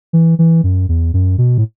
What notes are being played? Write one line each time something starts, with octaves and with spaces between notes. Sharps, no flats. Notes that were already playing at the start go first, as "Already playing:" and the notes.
E3
E3
F#2
E2
F#2
B2
A2